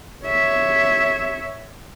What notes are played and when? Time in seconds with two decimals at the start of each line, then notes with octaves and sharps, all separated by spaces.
0.25 C#5 E5